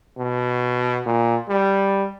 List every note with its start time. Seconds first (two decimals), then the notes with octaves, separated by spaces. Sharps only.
0.18 B2
1.06 A#2
1.49 G3